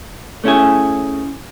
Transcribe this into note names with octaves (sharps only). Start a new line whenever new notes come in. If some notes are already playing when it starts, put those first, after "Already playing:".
A3 C#4 E4 G#4